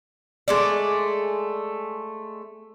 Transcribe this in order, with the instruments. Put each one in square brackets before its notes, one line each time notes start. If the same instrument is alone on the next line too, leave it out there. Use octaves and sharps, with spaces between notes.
[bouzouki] G#3 A3 D5